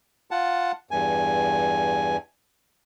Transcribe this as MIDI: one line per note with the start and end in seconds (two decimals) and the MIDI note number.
0.31 0.72 65
0.31 0.72 78
0.31 0.72 81
0.91 2.17 40
0.91 2.17 43
0.91 2.17 80